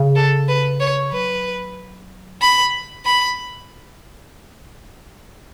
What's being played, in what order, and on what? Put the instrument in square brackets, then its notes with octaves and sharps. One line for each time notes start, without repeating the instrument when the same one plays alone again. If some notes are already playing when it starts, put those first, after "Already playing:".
Already playing: [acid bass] C#3
[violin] A4
B4
C#5
[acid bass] F#3 [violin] B4
[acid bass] C#3 [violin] B5
[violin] B5